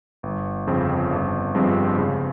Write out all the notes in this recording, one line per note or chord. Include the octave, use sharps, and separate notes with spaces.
G1
F2 C#3 F3 C4
G1
G2 F3 G#3 C4
C#3